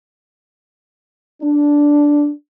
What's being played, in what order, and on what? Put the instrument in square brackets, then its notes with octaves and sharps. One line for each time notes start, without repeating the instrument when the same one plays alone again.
[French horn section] D4